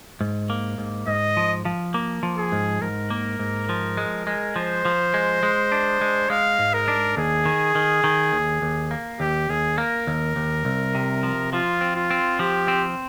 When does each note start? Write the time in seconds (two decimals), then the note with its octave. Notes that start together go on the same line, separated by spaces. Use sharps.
0.21 G#2
0.50 A#3
0.78 G#2
1.07 G#2 D#5
1.37 F3
1.65 F3
1.94 A#3
2.23 F3
2.38 G#4
2.52 G#2
2.82 G#2 A#4
3.10 A#3
3.39 G#2
3.69 F3
3.97 G#3
4.27 G#3
4.56 F3 C5
4.85 F3
5.14 G#3
5.43 G#3
5.72 D4
6.01 G#3
6.30 G#3 F5
6.59 G#2
6.73 A#4
6.88 D4
7.17 D#2 G#4
7.46 D#3
7.75 D#3
8.04 D#3
8.32 D#2
8.62 D#2
8.91 A#3
9.20 D#2 G4
9.49 D#2 G#4
9.78 A#3 A#4
10.07 D#2
10.36 D#2
10.65 C2
10.95 C3
11.23 F3
11.52 F3 F4
11.81 C4
11.96 F4
12.11 C4
12.39 F3 G4
12.68 C4